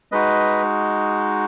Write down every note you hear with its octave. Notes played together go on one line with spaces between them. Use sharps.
G#3 D#4 F#4 B4 D#5